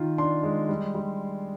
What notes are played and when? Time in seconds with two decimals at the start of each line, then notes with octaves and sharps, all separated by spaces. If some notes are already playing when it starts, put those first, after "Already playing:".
Already playing: D#3 F4
0.18 D4 C6
0.43 G#3
0.69 G3
0.95 G3